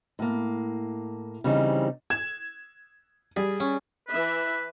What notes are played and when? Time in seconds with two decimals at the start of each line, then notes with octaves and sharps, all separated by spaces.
0.19 A2 A#3
1.44 C#3 E3 G3 C4 C#4 D#4
2.10 G#6 E7
3.36 G3 G#4
3.60 C#4
4.08 E3 B4 E5